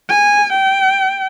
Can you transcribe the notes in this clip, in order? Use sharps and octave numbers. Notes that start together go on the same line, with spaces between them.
G#5
G5